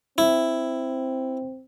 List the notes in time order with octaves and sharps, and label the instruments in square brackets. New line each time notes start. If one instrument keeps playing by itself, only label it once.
[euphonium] C4 [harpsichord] E4